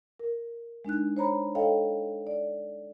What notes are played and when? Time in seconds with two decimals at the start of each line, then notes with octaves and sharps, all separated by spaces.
0.19 A#4
0.85 G#3 D4 D#4 F#6
1.17 C5 C#5 A#5 B5
1.55 A4 C#5 D#5 F5 G5
2.27 D5